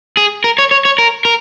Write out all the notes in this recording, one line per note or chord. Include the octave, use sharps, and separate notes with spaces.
G#4
A#4
C#5
C#5
C#5
A#4
A#4